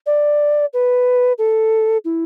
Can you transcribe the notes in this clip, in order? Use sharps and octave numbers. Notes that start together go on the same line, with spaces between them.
D5
B4
A4
E4